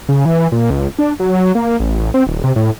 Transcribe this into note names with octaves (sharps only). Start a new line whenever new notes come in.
C#3
E3
A#2
C#2
D4
F#3
A#3
A1
C4
D#1
C3
A2